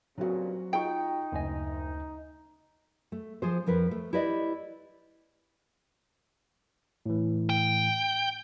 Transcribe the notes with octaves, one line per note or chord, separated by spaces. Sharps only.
G2 A#2 C#3 F#3 C4 F#4
D#4 F4 G#4 G5 C#6
F#1 D2 D#5 G#5
A3
F3 G#4 C5
F2 F3 A#4 B4
A3
E4 G4 B4 D5 D#5
A2 E3
G5